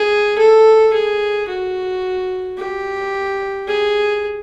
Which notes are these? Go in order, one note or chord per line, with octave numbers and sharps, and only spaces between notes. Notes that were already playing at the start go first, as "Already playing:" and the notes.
Already playing: G#4
A4
G#4
F#4
G4
G#4